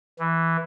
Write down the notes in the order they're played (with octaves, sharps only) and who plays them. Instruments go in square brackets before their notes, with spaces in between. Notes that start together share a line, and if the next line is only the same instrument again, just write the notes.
[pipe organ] E3